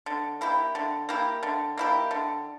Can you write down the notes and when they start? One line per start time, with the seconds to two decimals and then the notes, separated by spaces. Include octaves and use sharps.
0.06 D3
0.41 A#3 E4 G4
0.75 D3
1.09 A#3 E4 G4
1.43 D3
1.77 A#3 E4 G4
2.11 D3